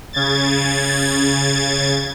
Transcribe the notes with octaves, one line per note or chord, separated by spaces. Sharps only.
C#3 G#6 A6